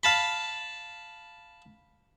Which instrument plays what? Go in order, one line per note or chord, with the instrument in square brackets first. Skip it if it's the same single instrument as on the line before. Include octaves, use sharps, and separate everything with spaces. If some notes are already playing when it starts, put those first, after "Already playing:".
[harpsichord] F5 A5 B5